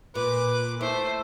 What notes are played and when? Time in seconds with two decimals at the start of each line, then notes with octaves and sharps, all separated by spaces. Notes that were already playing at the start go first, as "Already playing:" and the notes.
0.15 A#2 B4 D6
0.81 A3 E4 C5